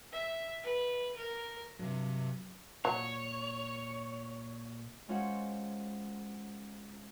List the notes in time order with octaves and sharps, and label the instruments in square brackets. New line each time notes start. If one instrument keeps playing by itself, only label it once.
[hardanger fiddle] E5
B4
A#4
[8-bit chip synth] G2 C3 [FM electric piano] F#3
[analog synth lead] A#2 [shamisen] F#3 [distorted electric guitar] C#5
[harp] G#3 C#4 F4 A#4 C5 F#5